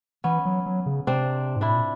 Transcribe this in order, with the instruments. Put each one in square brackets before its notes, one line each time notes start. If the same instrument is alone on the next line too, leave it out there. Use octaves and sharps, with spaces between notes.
[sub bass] E3 [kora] B3 C#4
[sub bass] F#3
F#3
C#3
[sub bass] C3 [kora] C4 D4
[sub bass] G#2
[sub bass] A2 [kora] D4 E4
[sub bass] A#2